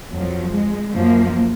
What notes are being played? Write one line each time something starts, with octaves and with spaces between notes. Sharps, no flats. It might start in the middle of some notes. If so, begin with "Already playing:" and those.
F2 F#3
F3
G#3
F#2 F3 A#3